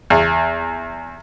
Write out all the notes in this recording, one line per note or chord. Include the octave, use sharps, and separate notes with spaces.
E2